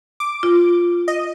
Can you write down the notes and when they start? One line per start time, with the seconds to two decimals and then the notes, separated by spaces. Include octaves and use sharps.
0.20 D6
0.43 F4
1.08 D#5